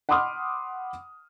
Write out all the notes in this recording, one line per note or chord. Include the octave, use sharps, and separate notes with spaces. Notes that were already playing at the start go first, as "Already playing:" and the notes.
F#5 B5 C6 D6 D#6 F6